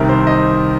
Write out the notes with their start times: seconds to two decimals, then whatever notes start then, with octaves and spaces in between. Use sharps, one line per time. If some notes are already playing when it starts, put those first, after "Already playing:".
Already playing: C2 C3 D#3 A#4
0.09 C5
0.27 D#5